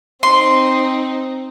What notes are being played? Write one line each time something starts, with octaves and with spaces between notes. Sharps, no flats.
C4 D#4 C6